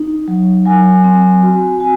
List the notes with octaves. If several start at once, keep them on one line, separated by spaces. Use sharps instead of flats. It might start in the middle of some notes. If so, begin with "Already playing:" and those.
Already playing: D#4
F#3
F#3 G#5
C4 G#5
F#4
F#4 G#5